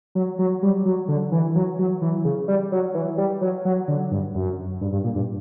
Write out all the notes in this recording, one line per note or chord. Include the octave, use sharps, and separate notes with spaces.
F#3
F#3
G3
F#3
D3
E3
F#3
F#3
E3
C#3
G3
F#3
E3
G3
F#3
F#3
D3
G2
F#2
G2
G2
A#2
G2